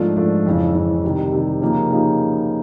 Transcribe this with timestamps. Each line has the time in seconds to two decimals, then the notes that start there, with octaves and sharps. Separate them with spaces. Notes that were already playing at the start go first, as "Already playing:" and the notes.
Already playing: G#2 F3 A3 D4 F4
0.17 G#2 F3 A3 D4 F4
0.46 F2 C#3 E3
0.75 F2 C#3 E3
1.04 C3 D#3 G3
1.32 C3 D#3 G3
1.61 C#3 F3 A#3 D#4 G4
1.91 C#3 F3 A#3 D#4 G4